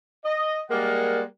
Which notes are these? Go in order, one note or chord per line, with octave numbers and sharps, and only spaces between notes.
D#5
G3 G#3 A#3 A#4 D5 F#5